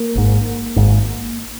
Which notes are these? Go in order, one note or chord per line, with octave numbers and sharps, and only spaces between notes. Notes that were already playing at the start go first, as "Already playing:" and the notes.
Already playing: A#3
G#1 G#2
G#1 G#2